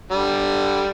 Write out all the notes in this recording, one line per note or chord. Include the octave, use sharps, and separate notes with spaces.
D3 G3